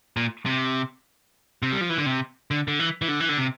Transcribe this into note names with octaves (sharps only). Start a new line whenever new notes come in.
A#2
C3
C3
G3
F3
E3
D3
C3
D3
D3
E3
E3
D3
E3
D3
C3